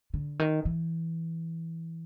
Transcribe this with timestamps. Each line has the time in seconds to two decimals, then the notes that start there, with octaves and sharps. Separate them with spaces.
0.14 D3
0.39 D#3
0.65 E3